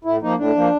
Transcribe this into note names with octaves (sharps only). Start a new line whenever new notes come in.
A2 E4
F3 A#3 D#4
A2 D4
F3 A#3